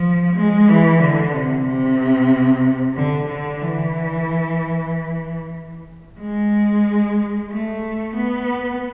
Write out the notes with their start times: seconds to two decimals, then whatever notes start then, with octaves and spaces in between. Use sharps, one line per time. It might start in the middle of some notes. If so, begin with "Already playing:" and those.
Already playing: F3
0.36 G#3
0.69 E3
1.01 D3
1.34 C3
1.66 C3
2.96 D3
3.29 D3
3.61 E3
6.21 G#3
7.52 A3
8.16 B3